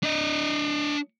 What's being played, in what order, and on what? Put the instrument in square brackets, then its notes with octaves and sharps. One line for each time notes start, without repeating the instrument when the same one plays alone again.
[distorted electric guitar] D4 D#5